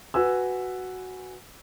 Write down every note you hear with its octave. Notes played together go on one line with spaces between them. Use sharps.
F#4 B4 G#5 E6